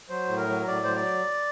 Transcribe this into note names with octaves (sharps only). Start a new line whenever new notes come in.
F#3 C5
A2
A#4
F#3
A2 D5
F#3 C5
D5